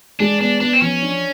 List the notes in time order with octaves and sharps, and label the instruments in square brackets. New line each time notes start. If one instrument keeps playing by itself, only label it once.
[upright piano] G#3 [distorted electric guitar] D4
[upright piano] B3 [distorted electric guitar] D4
[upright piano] B3 [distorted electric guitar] D4
[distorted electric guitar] C4
[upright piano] F3 [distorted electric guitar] C#4
[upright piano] D4